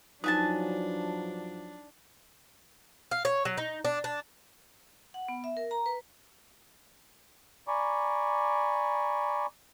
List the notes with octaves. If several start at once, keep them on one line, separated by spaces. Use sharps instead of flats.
G2 F3 F#3 D4 D#4 B4 G#5 A5
F5
C#5
F#3
D#4
D4
D4
F#5
B3
E5
A#4
A#5
B4
D5 G#5 A#5 B5 C#6 D6